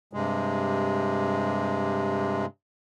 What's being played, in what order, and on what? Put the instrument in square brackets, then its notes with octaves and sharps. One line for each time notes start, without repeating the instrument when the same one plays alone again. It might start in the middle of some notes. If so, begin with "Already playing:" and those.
[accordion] G2 C3 G#3